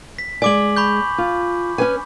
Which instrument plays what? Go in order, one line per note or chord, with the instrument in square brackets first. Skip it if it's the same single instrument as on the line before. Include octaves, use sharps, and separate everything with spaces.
[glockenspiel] B6
[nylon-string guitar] G#3 D5 [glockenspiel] G#5 D6 F#7
[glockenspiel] B5 C#6 G6
[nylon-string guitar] F4
C#4 B4 G#5